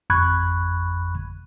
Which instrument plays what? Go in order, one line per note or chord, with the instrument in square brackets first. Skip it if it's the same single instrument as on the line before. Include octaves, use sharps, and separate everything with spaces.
[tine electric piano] G#1 F2 B5 C#6 F#6 G#6